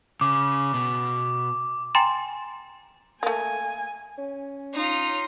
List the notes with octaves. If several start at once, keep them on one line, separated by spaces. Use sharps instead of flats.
C#3 D6
B2
G5 G#5 A#5 C6 A6 E7
A3 A#3 G#5
C#4
D#4 F4